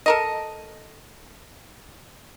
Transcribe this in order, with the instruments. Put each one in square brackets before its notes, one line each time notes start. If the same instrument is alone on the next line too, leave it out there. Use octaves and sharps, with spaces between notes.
[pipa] A4 A#4 D#5